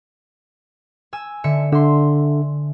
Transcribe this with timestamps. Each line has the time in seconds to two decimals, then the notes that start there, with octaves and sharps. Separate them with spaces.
1.13 G#5 E6
1.44 D3 E5 C#7
1.72 D3 E5 C6